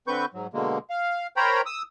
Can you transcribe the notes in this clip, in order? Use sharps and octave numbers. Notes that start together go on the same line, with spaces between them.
D3 C4 B4 C#6 G6
G#2 F#3
B2 D3 G#3 A#3
F5
A#4 C5 C#5 G5 A#5 B5
D#6 E6